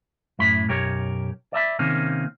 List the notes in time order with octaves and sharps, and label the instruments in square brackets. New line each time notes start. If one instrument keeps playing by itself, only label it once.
[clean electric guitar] F#2 A2 B5
B1 F#2 G4 A#4 C#5
D5 E5 A#5 B5
C3 D#3 A#3 C#4